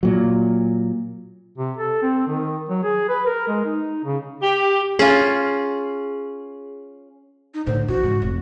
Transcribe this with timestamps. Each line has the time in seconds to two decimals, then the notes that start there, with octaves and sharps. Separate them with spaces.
0.03 A#2 F#3
1.58 C3
1.77 A4
2.02 C4
2.27 D#3
2.69 F#3
2.84 G#4
3.09 B4
3.26 A#4
3.48 G#3
3.65 D#4
4.05 C#3
4.42 G4
4.99 C#4 F4 G#4
7.54 D#4
7.66 A2 D3 C5
7.88 A#1 E3 F#4
8.03 G#2 C#3
8.22 F1